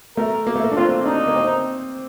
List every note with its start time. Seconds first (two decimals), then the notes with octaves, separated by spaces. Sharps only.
0.17 A3 A#4
0.47 A#3
0.56 A3
0.64 A#3
0.71 D4
0.76 C4 F4
1.05 D4 D#4
1.27 A#3
1.36 C4